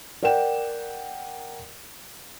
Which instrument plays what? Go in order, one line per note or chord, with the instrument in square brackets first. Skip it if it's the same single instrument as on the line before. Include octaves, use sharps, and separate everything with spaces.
[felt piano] A#4 D5 F#5 G5 E7